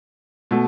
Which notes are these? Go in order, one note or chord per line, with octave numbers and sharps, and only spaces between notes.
B2 A3